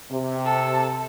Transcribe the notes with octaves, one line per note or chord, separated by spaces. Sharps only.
C3
A4